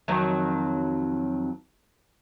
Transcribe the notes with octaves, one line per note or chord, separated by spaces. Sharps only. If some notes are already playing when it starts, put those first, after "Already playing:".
F2 D#3 F#3